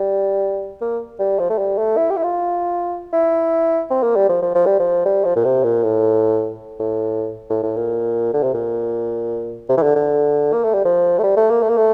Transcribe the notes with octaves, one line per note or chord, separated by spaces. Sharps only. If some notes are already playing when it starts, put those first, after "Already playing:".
Already playing: G3
A#3
G3
F3
A3
G3
A3
E4
G4
E4
F4
E4
C4
A#3
G3
F3
F3
F3
G3
F3
G3
F3
A#2
C3
A#2
A2
A2
A2
A2
A#2
D3
C3
A#2
C3
E3
D3
D3
A#3
A3
G3
F3
A3
G3
A3
A#3
A3
A#3
A3